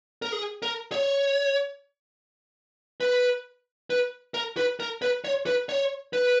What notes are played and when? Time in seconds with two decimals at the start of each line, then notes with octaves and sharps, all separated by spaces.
0.22 A#4
0.32 G#4
0.62 A#4
0.92 C#5
3.00 B4
3.90 B4
4.34 A#4
4.57 B4
4.80 A#4
5.02 B4
5.24 C#5
5.46 B4
5.69 C#5
6.13 B4